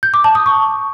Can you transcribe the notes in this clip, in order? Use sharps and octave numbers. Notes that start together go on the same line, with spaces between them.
G6
D6
A5
D#6
C#6